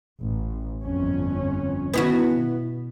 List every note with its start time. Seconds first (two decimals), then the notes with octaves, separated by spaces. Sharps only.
0.20 A1
0.83 G1 F2 C#4
1.94 D#3 B3 E4 F#4
2.31 B2